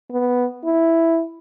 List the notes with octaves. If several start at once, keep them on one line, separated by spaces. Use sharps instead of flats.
B3
E4